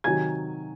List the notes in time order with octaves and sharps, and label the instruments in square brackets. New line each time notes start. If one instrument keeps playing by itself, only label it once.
[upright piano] C3 D#3 F#3 G#5 G#6